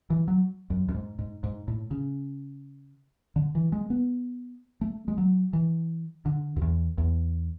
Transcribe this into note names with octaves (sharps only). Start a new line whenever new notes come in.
E3
F#3
F#2
F#2
G#2
G#2
G#2
A2
C#3
D3
E3
G#3
B3
A3
G#3
F#3
E3
D3
F#2
E2
E2